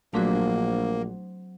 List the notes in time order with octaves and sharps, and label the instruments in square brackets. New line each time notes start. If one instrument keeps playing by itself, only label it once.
[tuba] A#1 [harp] F#3 C4 B6 [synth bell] A3 D4 F#4 [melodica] A#3